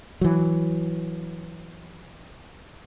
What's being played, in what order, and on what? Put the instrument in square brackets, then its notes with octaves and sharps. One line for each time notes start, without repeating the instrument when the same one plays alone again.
[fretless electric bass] E3 F#3